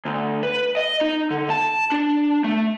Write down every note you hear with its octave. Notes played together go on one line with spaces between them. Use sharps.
D2
B4
D#5
D#4
D3
A5
D4
A3